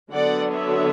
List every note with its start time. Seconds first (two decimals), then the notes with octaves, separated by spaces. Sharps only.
0.13 D3 F#3 B3 D4 D5 F#5
0.54 C#5 E5